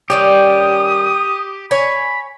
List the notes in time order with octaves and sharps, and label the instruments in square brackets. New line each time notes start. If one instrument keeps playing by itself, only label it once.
[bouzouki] D#3 G3 C#4 [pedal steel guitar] G4 [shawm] D#6
[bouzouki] C#5 G#5 [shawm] B5